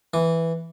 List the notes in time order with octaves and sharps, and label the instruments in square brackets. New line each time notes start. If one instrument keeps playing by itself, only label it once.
[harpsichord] E3